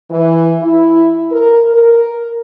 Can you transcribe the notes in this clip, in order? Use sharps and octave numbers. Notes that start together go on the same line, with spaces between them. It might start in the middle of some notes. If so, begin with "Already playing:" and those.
E3
E4
A#4
A#4